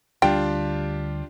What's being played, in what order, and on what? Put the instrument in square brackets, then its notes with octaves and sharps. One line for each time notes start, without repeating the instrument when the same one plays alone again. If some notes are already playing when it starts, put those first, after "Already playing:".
[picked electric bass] D2 D3 G3 [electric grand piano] D4 F4 G4 [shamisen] G5